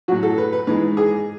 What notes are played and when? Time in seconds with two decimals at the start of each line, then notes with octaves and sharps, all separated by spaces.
0.08 A2 F#3 F#4
0.23 A4
0.38 B4
0.53 B4
0.67 G#2 E3 G#3 B4
0.97 G#4